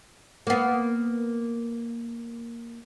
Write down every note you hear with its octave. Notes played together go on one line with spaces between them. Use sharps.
A#3 B3